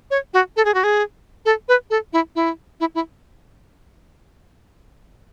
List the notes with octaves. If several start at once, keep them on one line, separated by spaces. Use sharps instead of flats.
C#5
F#4
A4
G#4
F#4
G#4
A4
B4
A4
E4
E4
E4
E4